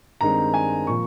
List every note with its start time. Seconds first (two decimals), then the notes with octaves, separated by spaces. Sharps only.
0.21 G2 D#3 G#3 C4 A#5
0.54 G#5
0.87 A#2 F3 C#6